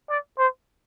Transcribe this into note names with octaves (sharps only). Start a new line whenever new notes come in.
D5
C5